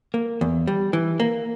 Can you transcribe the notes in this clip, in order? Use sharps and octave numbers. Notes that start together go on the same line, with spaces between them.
A#3
E2
G3
E3
A#3